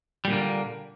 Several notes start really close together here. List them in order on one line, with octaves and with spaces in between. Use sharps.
G3 A#2 D3 A#3